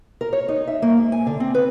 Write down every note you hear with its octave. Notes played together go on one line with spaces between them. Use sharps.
A#4
C#5
D#4
E5
A#3
G#2
G#5
D3
C4
B4